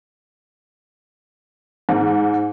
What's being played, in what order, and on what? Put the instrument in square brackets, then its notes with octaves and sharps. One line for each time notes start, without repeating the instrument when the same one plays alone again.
[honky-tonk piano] G#2